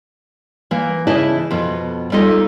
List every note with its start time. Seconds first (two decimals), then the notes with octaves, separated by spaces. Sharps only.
0.71 E3 A#3
1.07 C#3 E3 E4 D5 D#5 A5
1.51 F2 B2
2.12 G3 A#3 D#4 F4 A4 D#5